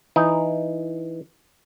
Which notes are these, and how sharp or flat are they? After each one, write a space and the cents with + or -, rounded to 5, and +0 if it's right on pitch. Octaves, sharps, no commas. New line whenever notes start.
E3 +0 D#4 +0